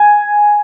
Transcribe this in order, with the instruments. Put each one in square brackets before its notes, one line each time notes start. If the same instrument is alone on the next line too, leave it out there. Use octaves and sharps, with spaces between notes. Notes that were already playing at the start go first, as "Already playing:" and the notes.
Already playing: [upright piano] G#5